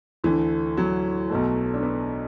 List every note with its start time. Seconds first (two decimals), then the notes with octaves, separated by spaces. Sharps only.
0.24 D2 D3 E3 A3
0.77 F#3
1.30 B1 B2 A3
1.74 D4
1.83 B3